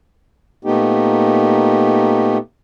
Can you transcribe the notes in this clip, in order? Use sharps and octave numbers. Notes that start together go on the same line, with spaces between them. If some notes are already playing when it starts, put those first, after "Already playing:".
A#2 A3 B3 D#4 G4